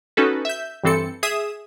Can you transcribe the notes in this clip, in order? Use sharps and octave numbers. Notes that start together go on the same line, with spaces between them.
C#4 D#4 F#4 A4 B4
E5 G6
G2 E3 C4 A4 C#7
G#4 E5 D#6 E7